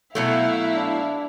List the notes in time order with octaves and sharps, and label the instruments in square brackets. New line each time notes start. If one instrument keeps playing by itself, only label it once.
[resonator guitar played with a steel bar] B2 F#3 A3 [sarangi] E4 [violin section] E5 F5
[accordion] D4